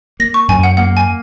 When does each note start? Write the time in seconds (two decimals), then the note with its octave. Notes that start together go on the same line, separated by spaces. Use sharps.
0.20 A#3 A#6
0.34 C#6
0.48 F#2 G#5
0.63 F#5
0.77 A#3 F#5
0.97 G#5